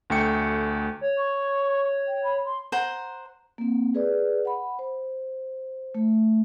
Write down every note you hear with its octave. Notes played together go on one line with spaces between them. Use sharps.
D2 A3 G5 C#7
C#5
C#6
G5
B5
C6
C5 F#5 A#5
A#3 C4
G#4 B4 D5
F#5 B5
C5
A3